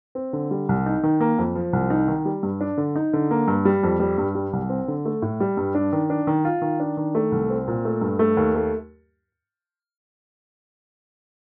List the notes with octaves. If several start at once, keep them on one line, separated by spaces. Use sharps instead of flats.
C4
D3
G3
C2
D#4
D#3
A#3
F2
F3
C2
D#4
D#3
G3
G2
D4
D3
D#4
D3
A#3
G2
G3
F2
G3
G2
G3
C2
C4
D3
A3
A2
G3
G2
D4
D#3
D4
D#3
F4
D#3
D4
D#3
A3
C2
C4
A#2
A3
G2
A3
D#2
A3